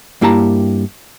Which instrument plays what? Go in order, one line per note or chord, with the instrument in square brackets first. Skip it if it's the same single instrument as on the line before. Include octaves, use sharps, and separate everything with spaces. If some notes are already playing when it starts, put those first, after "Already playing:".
[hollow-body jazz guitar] G2 A#3 E4 G4 A5 A#5